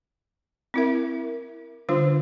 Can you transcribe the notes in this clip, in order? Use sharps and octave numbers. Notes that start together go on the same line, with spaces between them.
C4 E4 A#4 E5
D3 G3 D4 F4 C5